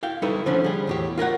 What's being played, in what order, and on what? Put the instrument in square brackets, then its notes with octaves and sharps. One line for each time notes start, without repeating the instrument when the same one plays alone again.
[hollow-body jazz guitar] E4 F5 G5
G3 D#4 E4 A4 B4 C#5
D3 F3 A3 C#4 D4
G3 G#4
E2 A2 G4
F4 A#4 C#5 F#5